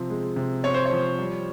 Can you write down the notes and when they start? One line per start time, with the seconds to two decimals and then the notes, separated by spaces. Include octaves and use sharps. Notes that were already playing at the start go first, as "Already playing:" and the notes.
Already playing: C3 F3 C4
0.10 G#3
0.36 C3
0.64 C4 C#5
0.74 C5
0.86 C#5
0.91 F3
1.19 G3